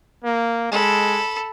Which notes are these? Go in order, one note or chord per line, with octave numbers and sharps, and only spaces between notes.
A#3
G#3 A4 B5